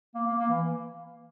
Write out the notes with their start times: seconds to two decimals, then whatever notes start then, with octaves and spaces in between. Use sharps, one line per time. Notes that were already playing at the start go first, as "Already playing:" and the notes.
0.15 A#3
0.27 A#3
0.39 A#3
0.50 E3